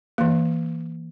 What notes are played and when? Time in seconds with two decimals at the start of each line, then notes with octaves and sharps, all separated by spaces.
0.18 E3 A#3